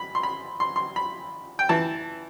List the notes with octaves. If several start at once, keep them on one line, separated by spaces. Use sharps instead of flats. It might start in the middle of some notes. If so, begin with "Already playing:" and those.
Already playing: B5
C6
B5
C6
C6
B5
G5
E3 A5